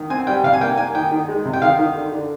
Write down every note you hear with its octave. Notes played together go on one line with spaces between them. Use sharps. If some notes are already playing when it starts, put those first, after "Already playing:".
Already playing: D#3
C4 G#5
G3 G5
C3 F5
G#5
A#3 G5
A#3 G#5
D#3 G5
D#3
G#3
C3
G5
D#3 F5
D#3
D3
D3